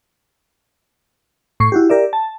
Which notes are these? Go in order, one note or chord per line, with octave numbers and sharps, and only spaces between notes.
A2 C#6 C7
E4 F#4 G4
G4 A#4 D5 E5
A5